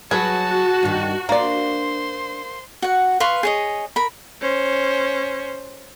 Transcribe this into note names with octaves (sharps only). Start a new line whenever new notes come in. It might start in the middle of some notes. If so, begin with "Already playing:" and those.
F#3 F#4 G#4 B4 A5
G2 D#3
A#3 D4 A#4 C5 D5 C6
F#4 F#5
B4 F5 C6 C#6
G#4 C#5 D#5
A#4 B5
C#4 C5